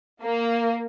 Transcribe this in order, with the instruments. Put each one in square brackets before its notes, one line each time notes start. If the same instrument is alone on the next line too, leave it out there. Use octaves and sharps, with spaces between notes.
[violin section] A#3